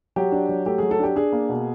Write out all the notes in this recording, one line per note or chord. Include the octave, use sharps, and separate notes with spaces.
F#3 G4
D4
F#3
A3 G4
F#3 G#4
A4
D4 G4
D4 G#4
A#3
B2